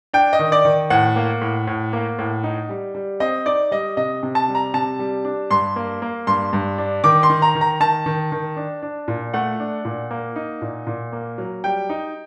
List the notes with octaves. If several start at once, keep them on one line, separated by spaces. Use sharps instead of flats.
D4 G5
D#5
D#3
D5
D#3
A2 F#5
A#3
A2
A2
A#3
A2
D#4
G3
G3
C4 D#5
D#4 D5
G3 D#5
C3 D#5
C3
A5
G3
A#5
C3 A5
G3
D4
G2 C6
A#3
A#3
G2 C6
G2
D4
D#3 D6
C6
D#3
A#5
D#3
A#5
D#3 A5
D#3
D#3
D4
D4
A#2
A3 F#5
D4
A#2
A#3
D#4
A#2
A#2
A#3
F#3
G3 G5
D#4